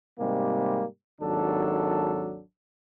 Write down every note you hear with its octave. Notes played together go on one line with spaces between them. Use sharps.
G#2 C3 G3 G#3 A#3
G#1 D#2 F#3 D4 A4